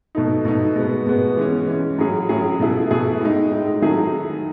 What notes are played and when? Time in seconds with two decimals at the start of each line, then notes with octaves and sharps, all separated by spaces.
0.15 B2 A3 D#4
0.45 B2 A3 D#4
0.76 B2 G#3 B3
1.06 B2 G#3 B3
1.37 E3 G#3 C#4
1.67 E3 G#3 C#4
1.99 A2 F#3 C#4 G#4
2.29 A2 F#3 C#4 G#4
2.60 B2 A3 E4 G#4
2.90 B2 A3 E4 G#4
3.21 A2 G#3 D#4
3.51 A2 G#3 D#4
3.82 D#3 F#3 A3 E4 G#4